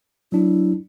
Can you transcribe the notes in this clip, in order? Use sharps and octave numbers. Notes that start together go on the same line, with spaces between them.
F#3 D4 E4